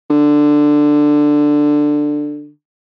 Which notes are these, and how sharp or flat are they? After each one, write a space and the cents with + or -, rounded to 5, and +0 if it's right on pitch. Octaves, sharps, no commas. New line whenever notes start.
D3 +10